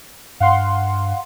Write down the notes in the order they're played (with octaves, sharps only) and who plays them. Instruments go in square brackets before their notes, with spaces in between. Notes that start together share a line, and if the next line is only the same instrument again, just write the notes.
[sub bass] G2 [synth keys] F5 F#5 C6